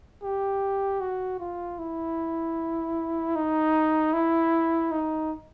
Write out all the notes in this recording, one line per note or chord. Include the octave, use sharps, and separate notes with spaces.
G4
F#4
F4
E4
D#4
E4
D#4